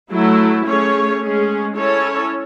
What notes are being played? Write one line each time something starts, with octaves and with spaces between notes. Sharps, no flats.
F#3 A3 E4
A3 C#4 G#4 C#5
G#3 C#4 G#4
C#4 E4 A4 C#5